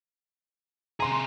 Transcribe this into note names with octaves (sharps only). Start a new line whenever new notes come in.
C3 G#4 A#5 C6